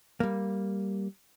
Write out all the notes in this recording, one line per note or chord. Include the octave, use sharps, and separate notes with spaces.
G3 A#3